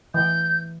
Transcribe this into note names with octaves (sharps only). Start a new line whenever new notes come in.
E3 G6